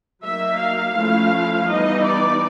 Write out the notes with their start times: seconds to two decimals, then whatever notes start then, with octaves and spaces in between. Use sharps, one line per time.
0.23 F#3 A#3 D#4 E5
0.60 F5
0.96 F3 A3 C#4 E4
1.68 E3 G3 B3 D#4 D#5
2.04 D5